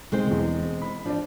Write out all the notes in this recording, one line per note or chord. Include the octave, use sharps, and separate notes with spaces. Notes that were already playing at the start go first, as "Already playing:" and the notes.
B1 G#3 C4 C5
E1 E2
B5
F3 D4 D5